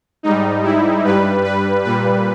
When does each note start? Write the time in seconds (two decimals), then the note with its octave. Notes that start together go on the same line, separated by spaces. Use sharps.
0.23 G#2 G3 D#4
0.64 E4
1.04 G2 G3 B4
1.44 B4
1.84 A#2 G3 B4